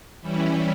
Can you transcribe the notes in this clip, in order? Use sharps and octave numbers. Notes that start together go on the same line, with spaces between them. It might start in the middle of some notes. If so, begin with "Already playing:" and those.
E3 G3 C#4 E4